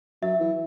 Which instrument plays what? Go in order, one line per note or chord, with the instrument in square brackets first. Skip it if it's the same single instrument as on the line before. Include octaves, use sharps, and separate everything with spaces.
[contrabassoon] F#3 [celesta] E5
[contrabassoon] E3